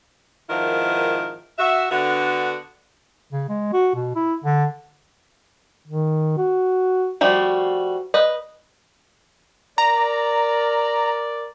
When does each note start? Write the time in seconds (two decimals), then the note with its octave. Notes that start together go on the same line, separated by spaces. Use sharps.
0.49 G#2 D#3 F3 B3 E4 A#4
1.58 F#4 E5
1.90 D3 B3 F#4
3.32 C#3
3.49 G#3
3.73 F#4
3.95 B2
4.15 E4
4.44 D3
5.87 D#3
6.38 F#4
7.21 F3 G3 A3 F#4
8.14 B4 D#5
9.78 A#4 D5 A#5